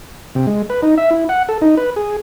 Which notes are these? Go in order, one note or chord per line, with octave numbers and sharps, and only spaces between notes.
C3
G#3
B4
D#4
E5
E4
F#5
A4
D#4
B4
G#4